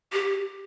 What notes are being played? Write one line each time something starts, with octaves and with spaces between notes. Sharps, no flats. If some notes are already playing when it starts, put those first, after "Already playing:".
G4